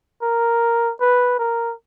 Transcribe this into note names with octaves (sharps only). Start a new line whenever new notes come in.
A#4
B4
A#4